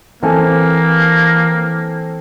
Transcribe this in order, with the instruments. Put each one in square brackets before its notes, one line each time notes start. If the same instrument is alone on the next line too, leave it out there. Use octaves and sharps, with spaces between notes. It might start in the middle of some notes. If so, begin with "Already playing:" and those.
[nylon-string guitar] E3 [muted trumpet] A#3 [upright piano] C4 A4 G#5